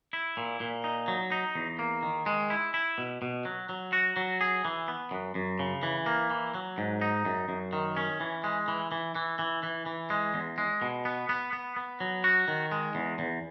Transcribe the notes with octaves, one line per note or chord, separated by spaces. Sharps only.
E4
A#2
A#2
D#4
F#3
D#4
E2
A#3
D#3
G#3
E4
E4
B2
B2
F#3
F#3
F#4
F#3
G#4
E3
B3
F#2
F#2
C#3
E3
A#3
E3
F#3
G#2
D#4
F#2
F#2
D#3
C#4
E3
G#3
E3
E3
E3
E3
E3
E3
G#3
E2
G#3
B2
B3
B3
B3
B3
F#3
F#4
D#3
G#3
E2
E2